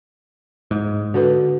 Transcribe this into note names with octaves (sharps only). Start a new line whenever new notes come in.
G#2
D3 F#4 A4 B4